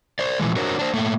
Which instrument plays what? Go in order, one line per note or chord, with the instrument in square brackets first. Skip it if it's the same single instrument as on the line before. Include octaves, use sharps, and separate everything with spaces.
[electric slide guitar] C5 D5
A#2 E3 F3 G#3
D4 F#4 A#4 C5 C#5
D4 C5
A2 A3 A#3